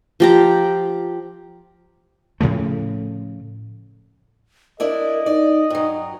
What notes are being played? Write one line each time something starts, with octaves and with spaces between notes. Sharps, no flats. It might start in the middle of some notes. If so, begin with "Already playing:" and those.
F3 G4 A#5
A2 C#3 F3 A3
D4 E4 A#4 D5 D#5
D#4 D5
G2 F#3